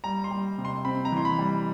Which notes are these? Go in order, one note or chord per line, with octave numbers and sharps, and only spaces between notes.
G3 A#5
C6
G3
C3
C6
C4 B5
A#5
E3 C6
B5
G3